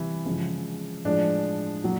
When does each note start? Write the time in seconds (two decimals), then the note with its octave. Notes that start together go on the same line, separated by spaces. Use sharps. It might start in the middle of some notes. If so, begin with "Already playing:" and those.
Already playing: C3 E3 G3 E4
0.25 C#3 F3 G#3
1.05 A2 F3 G#3 D4
1.84 A#2 F#3